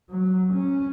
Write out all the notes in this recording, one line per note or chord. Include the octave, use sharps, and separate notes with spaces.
F#3
C#4